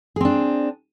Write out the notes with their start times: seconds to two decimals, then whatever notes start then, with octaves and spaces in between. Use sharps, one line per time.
0.16 G#4
0.21 C4
0.25 D4